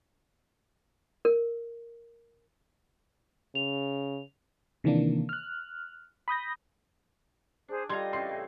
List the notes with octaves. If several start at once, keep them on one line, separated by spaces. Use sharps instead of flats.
A#4
C#3 F7
C3 D#3 E3 A#3 D4
F6 F#6
B5 D#6 G6 A#6
D4 G#4 C5
G3 F4 A4 D#5 G5 A#5 C6 G#6
C#3 E3 C4 C6 C7
A2